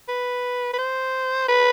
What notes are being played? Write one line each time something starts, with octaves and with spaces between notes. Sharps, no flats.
B4
B4
C5
B4